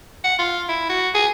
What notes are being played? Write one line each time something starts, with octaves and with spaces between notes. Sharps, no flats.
F#5
F4
E4
F#4
G#4